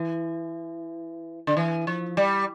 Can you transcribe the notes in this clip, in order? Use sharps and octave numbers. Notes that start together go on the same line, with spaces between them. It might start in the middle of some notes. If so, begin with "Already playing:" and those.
Already playing: E3
D3
E3
F3
G3